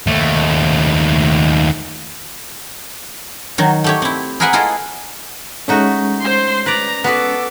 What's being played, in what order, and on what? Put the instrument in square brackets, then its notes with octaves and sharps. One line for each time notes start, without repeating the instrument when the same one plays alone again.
[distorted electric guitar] D#2 A3
[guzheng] D#3 F#3
A3 G4 C#5
C4 E4
G#4 A#4 B4 E5 F#5 G#5
E4 F4 G#4 A4 D#5
[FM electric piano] G#3 C#4 [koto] A3 D#4 F#4
[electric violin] C5 C6
[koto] B4 D5 [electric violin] A#5
[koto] B3 F#4 B4 [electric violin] A4 D6